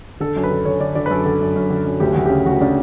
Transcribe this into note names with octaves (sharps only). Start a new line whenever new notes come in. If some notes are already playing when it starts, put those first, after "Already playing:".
D3 A4
F#2
B4
D3
D3 C#5
D3 D5
D3 D5
B4
F#2 A4
D3
F#2
F#2
D3
F#2
D2 G4
D2 F#4
C#3 G4
D2 F#4
C#3 D4